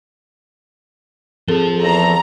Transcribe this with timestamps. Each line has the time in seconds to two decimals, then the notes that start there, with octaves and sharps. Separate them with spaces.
1.48 F3 C4 F4 G#4 A4
1.80 E2 A4 A#5